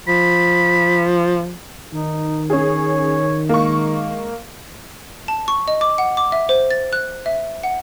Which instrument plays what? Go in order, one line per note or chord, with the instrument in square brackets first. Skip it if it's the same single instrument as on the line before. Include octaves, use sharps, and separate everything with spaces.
[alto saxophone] F3 [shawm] B5
[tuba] D#3 [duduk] D#4
[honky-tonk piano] C#4 G#4 [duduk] C#5
[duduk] G#3 [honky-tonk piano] A#3 C#6
[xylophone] A5
C#6
D#5
D6
F#5
D6
E5
C5
A6
F#6
E5
F#5